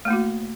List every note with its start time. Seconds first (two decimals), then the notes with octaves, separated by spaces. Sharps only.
0.05 A3
0.08 A#3
0.10 E4
0.13 F#4